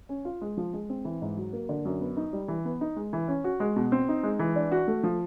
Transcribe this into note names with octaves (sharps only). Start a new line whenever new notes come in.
C#4
F4
G#3
F3
G#3
C4
E3
G#2
F#3
A#3
D3
F#2
B3
D#4
G3
E3
B3
D#4
G#3
E3
C#4
F#4
G#3
B2
C4
D#4
G#3
E3
D4
F#4
A3
F3